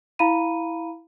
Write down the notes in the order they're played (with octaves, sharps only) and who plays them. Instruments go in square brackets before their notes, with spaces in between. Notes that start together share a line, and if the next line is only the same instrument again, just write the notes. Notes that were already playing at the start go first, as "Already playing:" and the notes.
[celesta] E4 F5 A#5 B5 D#7